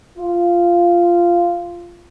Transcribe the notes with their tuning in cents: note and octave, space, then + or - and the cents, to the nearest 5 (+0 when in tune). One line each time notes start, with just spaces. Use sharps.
F4 -10